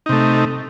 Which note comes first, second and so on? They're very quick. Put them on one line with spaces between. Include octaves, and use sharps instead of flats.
D#4 C3 A3